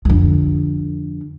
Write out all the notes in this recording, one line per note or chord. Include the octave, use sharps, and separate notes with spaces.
F2 D3